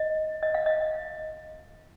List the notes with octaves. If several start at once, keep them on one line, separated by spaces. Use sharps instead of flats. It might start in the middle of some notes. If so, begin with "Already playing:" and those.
Already playing: D#5
D#5
F5
D#5